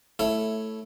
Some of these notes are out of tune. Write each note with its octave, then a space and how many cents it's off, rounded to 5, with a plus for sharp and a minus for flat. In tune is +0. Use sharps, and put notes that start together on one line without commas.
A3 +0 E4 +0 C#5 +0